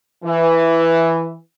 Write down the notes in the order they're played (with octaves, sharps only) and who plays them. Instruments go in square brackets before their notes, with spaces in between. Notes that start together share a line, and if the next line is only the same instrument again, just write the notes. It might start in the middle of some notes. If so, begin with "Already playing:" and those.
[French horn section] E3